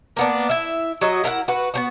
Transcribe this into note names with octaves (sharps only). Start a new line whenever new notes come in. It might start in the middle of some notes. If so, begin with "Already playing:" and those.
A#3 B3 D4
E4 E5
F#3 F#4 D#5
E4 A#4 F5 F#5
F#4 B4
B3 C4 F#4